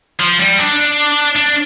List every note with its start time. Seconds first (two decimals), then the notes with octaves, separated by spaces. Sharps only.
0.19 F3
0.39 G3
0.59 D4
1.36 D4